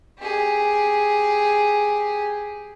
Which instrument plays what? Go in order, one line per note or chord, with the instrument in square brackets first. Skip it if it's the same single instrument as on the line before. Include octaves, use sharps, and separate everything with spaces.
[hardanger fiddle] G4 G#4